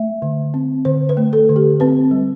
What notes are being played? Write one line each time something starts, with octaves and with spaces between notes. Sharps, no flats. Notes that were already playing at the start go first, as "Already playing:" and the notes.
Already playing: A3 E5
D3
C4
D3 C5
B4
A3
A4
D3
G4
C4 B4
G3